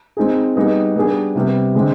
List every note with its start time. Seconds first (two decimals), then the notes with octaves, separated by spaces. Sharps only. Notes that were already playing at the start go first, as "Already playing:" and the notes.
0.17 G#3 C4 D#4 G#4
0.56 G3 B3 D#4 G#4
0.96 G3 B3 D4 G#4
1.35 C3 G3 B3
1.75 D3 G#3 C4 G4